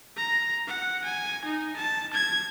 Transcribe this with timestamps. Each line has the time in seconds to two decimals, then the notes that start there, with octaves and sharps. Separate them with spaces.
0.16 A#5
0.67 F#5
1.05 G#5
1.45 D#4
1.76 A5
2.14 G#6